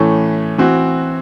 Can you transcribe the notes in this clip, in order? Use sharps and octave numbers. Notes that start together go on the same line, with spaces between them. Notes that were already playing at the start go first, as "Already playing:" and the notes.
Already playing: A2 E3 A3 C#4
E3 C4 F#4